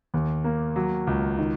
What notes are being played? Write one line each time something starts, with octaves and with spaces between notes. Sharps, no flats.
D#2
A#3
F#3
C#2
D#3